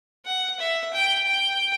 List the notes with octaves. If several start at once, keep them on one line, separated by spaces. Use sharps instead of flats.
F#5
E5
G5
G5